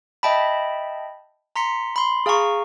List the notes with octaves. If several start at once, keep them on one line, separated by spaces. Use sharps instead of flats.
D#5 E5 G5 A5 B5
A#5 C6 B6 C#7
B5 C6
G#4 F5 G#5 A#5 C#6